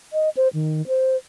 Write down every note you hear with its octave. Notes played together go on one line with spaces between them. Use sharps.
D#5
C5
D#3
C5